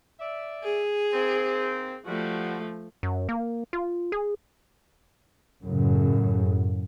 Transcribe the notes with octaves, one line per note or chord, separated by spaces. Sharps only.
D5 E5
G#4
G#2 A#3 C4
F3 G3 A3 F#4
F#2
A#3
F4
G#4
F#2 A2 C#3